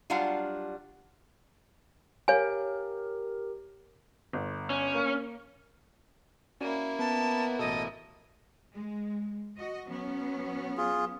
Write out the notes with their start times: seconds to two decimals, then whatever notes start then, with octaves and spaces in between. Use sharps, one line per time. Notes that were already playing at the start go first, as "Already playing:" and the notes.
0.10 F#3 G3 D4 F4 F5 F#5
2.28 G4 A#4 C#5 F5 G#5
4.33 G1
4.70 C#4
4.94 A#3
6.61 A#3 C#4 E4 F#4 D5
6.99 B3 A5
7.59 A1 B2 A4 D#5
8.74 G#3
9.58 F#4 D#5
9.88 F#3 B3 C#4
10.77 F4 G#4